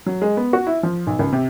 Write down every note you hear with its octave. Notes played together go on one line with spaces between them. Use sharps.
F#3
G#3
B3
F#4
E4
F3
B1
C#2
C3